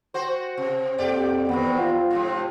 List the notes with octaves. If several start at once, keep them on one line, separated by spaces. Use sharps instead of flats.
F#4 C5
C3
F2 A#2 G4 D5
E2 C3 D#3 B3
F4
G#2 C3 F3